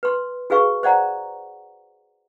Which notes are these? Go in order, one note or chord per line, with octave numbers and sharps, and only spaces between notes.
B4 C6
F#4 G#4 B4 F5 C#6
C5 D5 F#5 A#5